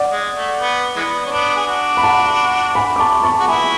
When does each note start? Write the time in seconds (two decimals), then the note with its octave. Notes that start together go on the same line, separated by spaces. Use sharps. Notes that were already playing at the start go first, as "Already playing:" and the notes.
Already playing: D5 F#5
0.11 G#3
0.35 A3
0.60 B3
0.96 E3 G#3 B3
1.26 C#4
1.31 B3 D4
1.56 G#4
1.67 D4 F#4
1.97 B5
2.03 F#5 A5
2.75 G#5 B5
2.96 D6
3.00 A5 C#6
3.23 A5 C#6
3.40 F#4
3.48 E4 G#4 G#5 B5